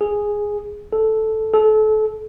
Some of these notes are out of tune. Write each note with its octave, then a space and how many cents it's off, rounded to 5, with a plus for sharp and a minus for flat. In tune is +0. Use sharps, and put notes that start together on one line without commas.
G#4 +0
A4 -5
A4 -30